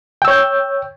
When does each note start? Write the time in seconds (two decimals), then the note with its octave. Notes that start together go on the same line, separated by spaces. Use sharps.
0.22 G5
0.25 E6
0.28 C#5
0.31 G6